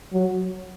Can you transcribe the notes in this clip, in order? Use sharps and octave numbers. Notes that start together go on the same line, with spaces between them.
F#3